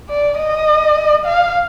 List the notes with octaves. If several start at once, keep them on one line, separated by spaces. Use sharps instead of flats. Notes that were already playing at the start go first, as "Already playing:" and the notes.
D5
D#5
F5